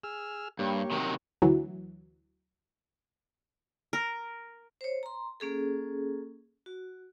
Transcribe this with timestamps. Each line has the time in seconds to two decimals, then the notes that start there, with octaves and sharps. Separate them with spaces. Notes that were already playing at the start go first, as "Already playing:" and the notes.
0.04 G#4 E6 F6
0.59 G2 A#3 G4 C#5
0.91 C3 D#3 F#3
1.42 D2 E3 F#3
3.93 A#4
4.81 C5 C#5
5.03 A#5 C6
5.40 A#3 C#4 G#4 A4
6.66 F#4